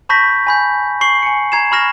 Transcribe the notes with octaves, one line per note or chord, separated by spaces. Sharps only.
A5 B5 C#6 G6 A#6 B6
G#5 B5 G6
C#6 C7 F#7
G#5 C#7
A#5 G#6 C7 E7
B5 C#6 F6 A#6 E7